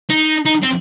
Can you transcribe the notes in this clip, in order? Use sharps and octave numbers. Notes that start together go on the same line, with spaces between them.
D#4
D#4
C4